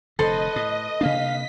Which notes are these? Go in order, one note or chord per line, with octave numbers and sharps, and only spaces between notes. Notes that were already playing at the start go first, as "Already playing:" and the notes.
F1 D3 A4 B4 C5 D#5
A2 D#6
C3 A#3 D4 F5 B6